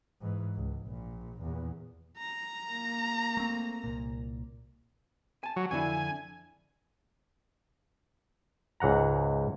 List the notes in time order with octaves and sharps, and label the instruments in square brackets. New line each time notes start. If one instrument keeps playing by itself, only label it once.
[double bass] G#2 E3
C#2
A#1 A#2
E2 A#2
[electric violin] A#5
[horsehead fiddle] A#3
[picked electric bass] A3 C4
C2 A#2
[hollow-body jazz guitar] G#5 A5
[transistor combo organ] F#3
[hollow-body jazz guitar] F2 D3 E4 [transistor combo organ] G#5
[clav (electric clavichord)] C#2 G#2 F#5 A#5